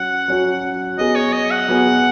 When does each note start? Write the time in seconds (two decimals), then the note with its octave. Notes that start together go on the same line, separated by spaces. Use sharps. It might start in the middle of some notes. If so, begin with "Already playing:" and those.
Already playing: F#3 C#4 F#4 F#5
0.28 F#3 C#4 F#4
0.98 F#3 B3 G#4 D#5
1.16 C#5
1.33 D#5
1.51 F#5
1.68 F#3 B3 G#4